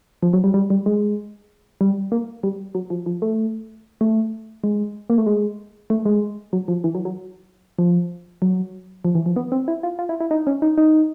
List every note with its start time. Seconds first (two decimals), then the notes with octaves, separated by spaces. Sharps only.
0.23 F3
0.33 F#3
0.44 G3
0.54 G3
0.70 G3
0.86 G#3
1.81 G3
2.12 A#3
2.43 G3
2.75 F#3
2.90 F3
3.06 F3
3.22 A3
4.01 A3
4.64 G#3
5.10 A#3
5.18 A3
5.26 G#3
5.90 A3
6.05 G#3
6.53 F#3
6.68 F3
6.84 E3
6.95 F#3
7.05 F#3
7.79 F3
8.42 F#3
9.05 F3
9.15 E3
9.26 F3
9.36 B3
9.52 C4
9.68 E4
9.83 F4
9.99 F4
10.09 E4
10.20 E4
10.31 D#4
10.47 C#4
10.62 D#4
10.78 D#4